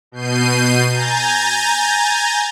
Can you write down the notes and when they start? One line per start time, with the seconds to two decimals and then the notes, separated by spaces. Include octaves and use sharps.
0.12 B2 G6 C7 D#7
0.89 G#5 A#5 G6 A6